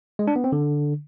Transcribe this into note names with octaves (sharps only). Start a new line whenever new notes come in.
G#3
D4
B3
C4
D3